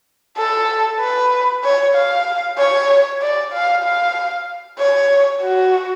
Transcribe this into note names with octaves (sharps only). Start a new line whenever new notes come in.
A4
B4
C#5
F5
C#5
D5
F5
F5
C#5
F#4